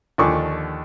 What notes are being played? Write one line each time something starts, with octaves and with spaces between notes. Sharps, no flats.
D#2 D3 F3 D5 G#5 C#6